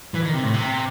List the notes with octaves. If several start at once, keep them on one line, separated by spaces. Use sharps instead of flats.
E3
D#3
C3
A2
C3